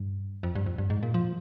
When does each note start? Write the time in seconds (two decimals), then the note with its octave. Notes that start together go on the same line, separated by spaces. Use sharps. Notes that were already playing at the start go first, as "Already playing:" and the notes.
Already playing: G2
0.43 F2
0.55 G2
0.66 F2
0.78 G2
0.90 G#2
1.03 A#2
1.14 F3